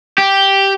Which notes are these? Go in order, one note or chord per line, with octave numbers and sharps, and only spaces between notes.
G4